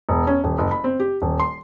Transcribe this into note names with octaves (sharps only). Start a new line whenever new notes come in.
E1
C#4
D#1
F#1
B5
C4
G4
D#1
C6